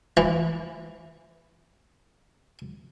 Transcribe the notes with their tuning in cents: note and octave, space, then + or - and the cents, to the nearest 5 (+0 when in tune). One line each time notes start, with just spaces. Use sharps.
E3 +0